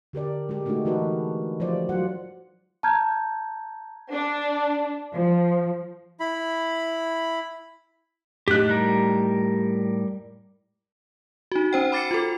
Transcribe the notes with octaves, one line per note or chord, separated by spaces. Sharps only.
D3 G4 A#4 D5
G#3 G4
G#3 A3 D4 D#4 F#4 G#4
E3 D#4 F#4 A#4 B4
F3 F4 G4 C5 D5
F#3 F4 F#5
A5 A#5 F6 G6 G#6
D4
F3
E4 B5
A2 D#4 G4 F#6
G3 A#4
D#4 F#4
C#4 C5 G5
B5 D6 A6 C7 C#7
F4 A4